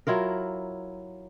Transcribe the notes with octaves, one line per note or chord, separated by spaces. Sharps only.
F#3 E4 F4 A#4